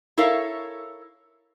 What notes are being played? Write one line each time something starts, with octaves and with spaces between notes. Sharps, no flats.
E4 A4 A#4 C#5 E5 F5